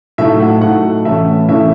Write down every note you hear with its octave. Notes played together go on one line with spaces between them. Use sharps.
A2 F#3 A3 D#4 E5
F#5
A2 F#3 A3 D#4 F#5
A2 E3 A3 C#4 E5
A2 E3 A3 C#4 E5